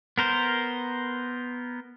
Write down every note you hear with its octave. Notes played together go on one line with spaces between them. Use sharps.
B3 A#4 C5